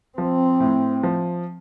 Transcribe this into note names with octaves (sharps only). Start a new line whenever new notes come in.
F3 C4
A2
F3